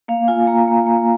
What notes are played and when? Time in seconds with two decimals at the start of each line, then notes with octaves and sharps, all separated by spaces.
0.08 A#3 F5
0.28 F4 G#5
0.47 A#3 A#5
0.67 A#3
0.87 A#3